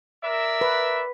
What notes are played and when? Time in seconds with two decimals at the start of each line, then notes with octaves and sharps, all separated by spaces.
0.24 A#4 D5 E5
0.61 B4